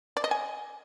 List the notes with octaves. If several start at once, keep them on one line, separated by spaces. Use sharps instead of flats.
D5
D#5
G#5